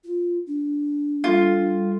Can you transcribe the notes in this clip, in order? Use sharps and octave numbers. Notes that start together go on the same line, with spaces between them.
F4
D4
G3 F4 A4